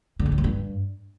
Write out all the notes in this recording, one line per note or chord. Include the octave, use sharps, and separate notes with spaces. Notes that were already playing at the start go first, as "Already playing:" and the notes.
D3
G#2
E2
F#3
G2